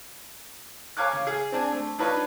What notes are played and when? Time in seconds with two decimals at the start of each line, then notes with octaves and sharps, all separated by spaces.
0.97 A#4 C#5 F5 G#5 D6 F#6
1.13 C#3
1.27 G#4 F5
1.52 C4 D4 G#5
1.72 A3
1.99 D4 D#4 F4 B4 C#5